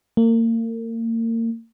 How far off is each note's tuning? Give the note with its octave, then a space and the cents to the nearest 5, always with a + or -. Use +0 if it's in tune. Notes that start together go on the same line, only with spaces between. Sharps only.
A#3 -35